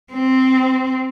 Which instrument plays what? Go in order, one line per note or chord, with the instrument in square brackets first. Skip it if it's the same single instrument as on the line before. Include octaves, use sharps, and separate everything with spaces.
[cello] C4